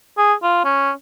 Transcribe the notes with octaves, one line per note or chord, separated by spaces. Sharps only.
G#4
F4
C#4